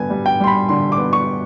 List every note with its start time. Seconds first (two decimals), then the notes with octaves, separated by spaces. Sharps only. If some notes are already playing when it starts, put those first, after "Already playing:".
Already playing: G2 D3 G3 B3 G#5
0.10 G3
0.26 G5
0.40 G3 C6
0.47 B5
0.69 D3 C6
0.92 D6
0.98 B3
1.13 C#6